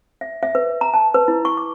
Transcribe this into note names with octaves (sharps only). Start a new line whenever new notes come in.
E5
E5
B4
A#5
A5
B4
E4
C#6
D6